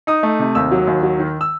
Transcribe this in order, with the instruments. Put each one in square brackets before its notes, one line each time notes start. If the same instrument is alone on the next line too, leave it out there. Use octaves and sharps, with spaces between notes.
[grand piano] D#4 D#6
A3
C3
D#2 E6
F#3
D#2
F#3
D#3
E6